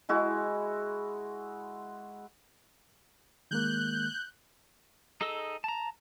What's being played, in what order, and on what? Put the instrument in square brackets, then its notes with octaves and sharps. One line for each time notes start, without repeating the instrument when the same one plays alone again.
[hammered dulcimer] G#3 E4 F#4
[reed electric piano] D#3 G#3 A#3 [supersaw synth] F#6 G6
[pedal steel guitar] D#4 G#4 A4 D#5 E6
A5 A#5